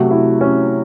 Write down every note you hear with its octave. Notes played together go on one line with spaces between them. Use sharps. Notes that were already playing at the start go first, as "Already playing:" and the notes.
Already playing: C3 F#3 A3 F#4
E4
C#4